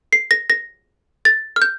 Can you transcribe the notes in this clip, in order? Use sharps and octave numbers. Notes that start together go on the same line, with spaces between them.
C7
A#6
A#6
A6
F6
G6